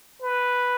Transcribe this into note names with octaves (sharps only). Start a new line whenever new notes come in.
B4